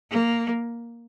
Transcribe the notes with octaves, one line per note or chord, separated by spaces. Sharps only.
A#3